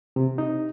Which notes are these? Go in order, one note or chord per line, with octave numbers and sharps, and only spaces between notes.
C3
D#4